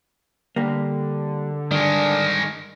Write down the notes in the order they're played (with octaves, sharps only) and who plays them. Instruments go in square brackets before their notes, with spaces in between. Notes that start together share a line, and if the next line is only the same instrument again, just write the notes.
[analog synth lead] D3 [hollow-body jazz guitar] G3 A#3
[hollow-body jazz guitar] G2 [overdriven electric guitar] D#3 G#3 [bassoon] D4